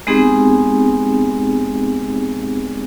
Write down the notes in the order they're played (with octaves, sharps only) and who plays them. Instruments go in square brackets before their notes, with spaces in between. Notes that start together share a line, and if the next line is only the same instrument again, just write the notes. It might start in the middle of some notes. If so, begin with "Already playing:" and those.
[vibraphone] G#3 B3 C4 D#4 G4 G#4